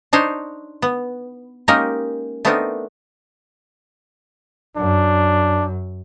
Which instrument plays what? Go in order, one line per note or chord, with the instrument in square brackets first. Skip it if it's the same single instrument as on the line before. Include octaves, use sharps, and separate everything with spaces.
[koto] D4 D#4 C5 C#5
B3
G#3 A#3 C#4 D#4 G4 A#4
A3 B3 C4 D4 D#4 A#4
[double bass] F#2 [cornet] D4